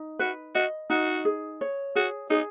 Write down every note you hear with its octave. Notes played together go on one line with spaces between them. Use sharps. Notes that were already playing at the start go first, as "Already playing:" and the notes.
Already playing: D#4
F#4 B4
F#4 D#5
D#4 F#4
G#4
C#5
F#4 G#4
D#4 G#4